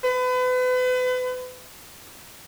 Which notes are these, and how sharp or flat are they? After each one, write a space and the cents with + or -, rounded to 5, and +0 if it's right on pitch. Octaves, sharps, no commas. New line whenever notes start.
B4 +35